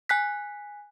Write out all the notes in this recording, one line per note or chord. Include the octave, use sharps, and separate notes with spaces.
G#5 F#6 B6